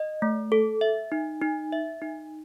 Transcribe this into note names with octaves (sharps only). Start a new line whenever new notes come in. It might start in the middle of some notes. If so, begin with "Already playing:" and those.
Already playing: D#5
A3
A4
E5
D#4
D#4
E5
D#4